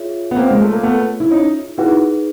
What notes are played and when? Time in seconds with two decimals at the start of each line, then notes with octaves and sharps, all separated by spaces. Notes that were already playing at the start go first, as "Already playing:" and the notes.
Already playing: F4 G#4 C#5 E5
0.31 B3
0.36 A#3 C4
0.51 G#3
0.62 A3
0.73 A#3
0.83 A3 B3
1.20 E4
1.31 C#4 D#4
1.78 D#4 E4 F#4 G#4 B4